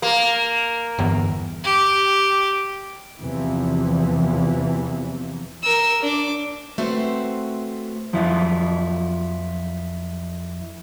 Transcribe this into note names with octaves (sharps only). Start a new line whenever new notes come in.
A#3
G1 E2
G4
E2 C3 E3 F3
A#4 E6
D4 D6
A3 C4 F#4 B4 C5
F2 F3 F#3 E4